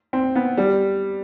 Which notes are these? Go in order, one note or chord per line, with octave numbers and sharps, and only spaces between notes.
C4
B3
G3